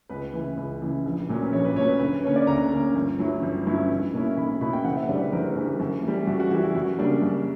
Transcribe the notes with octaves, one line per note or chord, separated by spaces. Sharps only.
C#2 B4
C#3 E3
C#2
C#3 E3
A#1
A#2 F#3 C#4
B4
A#1 C#5
B4
A#2 F#3 C#4 C#5
B4
D2 B4
D3 A#3 C#4 C#5
D5
D2 A#5
D3 A#3 C#4
G1
G2 F#3 C#4 E4
G1
G2 F#3 C#4 E4
B1
B2 A#3 C#4 E4
B1 B5
B2 A#3 C#4 E4 B5
G5
F#1 F#5
E5
F#2 D3 G3 D5
B4
F#1 A#4
F#2 D3 G3
F#2
E3 G3
F#2 F#4
F#4
E3 G3 F#4
E4
F#2 F#4
C#3 G3 A#3 D4
F#2